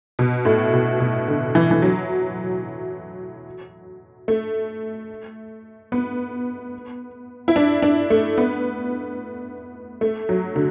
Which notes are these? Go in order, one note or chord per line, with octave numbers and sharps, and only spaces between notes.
B2
A2
B2
B2
D3
E3
E3
F#3
A3
B3
E4
D4
D4
A3
B3
A3
F#3
D3